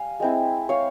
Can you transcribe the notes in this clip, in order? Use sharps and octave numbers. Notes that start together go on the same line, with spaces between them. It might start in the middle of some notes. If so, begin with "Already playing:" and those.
Already playing: G3 F5 G#5
G#3 C4 E4
C#5 F5